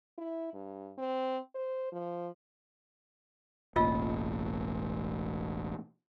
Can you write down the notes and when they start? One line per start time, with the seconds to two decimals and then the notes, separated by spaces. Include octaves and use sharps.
0.18 E4
0.54 G2
0.98 C4
1.55 C5
1.92 F3
3.76 E1 A1 A#3 F4 D#5 E6